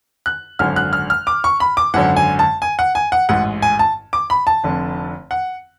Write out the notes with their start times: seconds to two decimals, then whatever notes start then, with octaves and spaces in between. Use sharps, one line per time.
0.26 F#6
0.59 G#1 F#2 D3 F6
0.76 F#6
0.93 F6
1.10 F6
1.27 D6
1.44 C#6
1.60 B5
1.77 D6
1.94 G#1 F#2 D3 F#5
2.17 G#5
2.39 A5
2.62 G#5
2.79 F#5
2.95 G#5
3.12 F#5
3.29 A1 G#2 F#5
3.62 G#5
3.79 A5
4.13 D6
4.30 B5
4.47 A5
4.64 F1 F2 D3
5.31 F#5